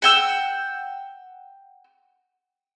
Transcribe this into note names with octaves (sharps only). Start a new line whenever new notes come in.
F#5 G5 E6